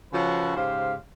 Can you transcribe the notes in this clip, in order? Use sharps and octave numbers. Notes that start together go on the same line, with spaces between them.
C#3 F3 C#4 F#4 A4 B4
G#2 C#3 G4 C5 F5